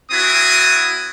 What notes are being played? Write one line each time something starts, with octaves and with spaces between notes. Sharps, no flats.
C4 E4 F#4 G#5 D#6